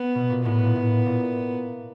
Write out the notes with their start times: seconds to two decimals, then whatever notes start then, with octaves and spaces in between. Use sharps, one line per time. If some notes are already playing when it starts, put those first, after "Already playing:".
Already playing: B3
0.15 B2
0.30 A#2
0.45 A2 B3
0.65 A#2
0.76 A2
1.06 A#2